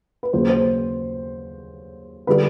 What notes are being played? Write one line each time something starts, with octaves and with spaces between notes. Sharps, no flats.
B4
D#2 C#3 F#3 C5
C5
D3 G3 B4